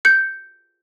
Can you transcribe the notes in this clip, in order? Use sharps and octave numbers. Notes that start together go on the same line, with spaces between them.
G6 C#7